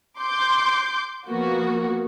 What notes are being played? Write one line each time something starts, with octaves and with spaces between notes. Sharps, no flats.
C6 D6 G6
F3 A#3 B3 F#4